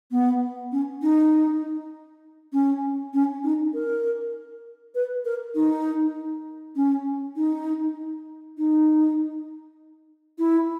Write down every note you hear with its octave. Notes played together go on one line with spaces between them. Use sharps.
B3
C#4
D#4
C#4
C#4
D#4
A#4
B4
A#4
D#4
C#4
D#4
D#4
E4